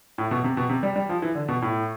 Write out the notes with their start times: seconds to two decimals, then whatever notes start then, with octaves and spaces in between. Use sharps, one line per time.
0.18 A2
0.31 B2
0.44 C3
0.57 B2
0.69 C3
0.83 G3
0.96 G3
1.09 F3
1.22 E3
1.35 D3
1.48 B2
1.62 A2